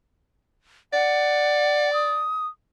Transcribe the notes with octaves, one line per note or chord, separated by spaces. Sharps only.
D5 F#5
D#6